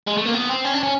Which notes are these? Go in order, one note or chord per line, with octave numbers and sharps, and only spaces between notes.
G#3
A3
A#3
B3
C4
C#4
D4
C#4